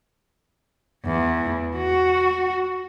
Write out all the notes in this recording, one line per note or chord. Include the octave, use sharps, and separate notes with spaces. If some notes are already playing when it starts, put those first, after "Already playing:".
E2
F#4